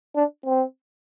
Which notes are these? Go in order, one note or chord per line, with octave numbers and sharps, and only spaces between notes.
D4
C4